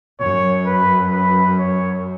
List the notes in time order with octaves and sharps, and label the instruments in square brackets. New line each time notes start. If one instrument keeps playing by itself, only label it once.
[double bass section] F#2 [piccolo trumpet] C#5
[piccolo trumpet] B4
B4
C#5